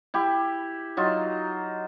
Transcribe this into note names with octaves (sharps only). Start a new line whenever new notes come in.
E4 G4
F#3 D#4 F4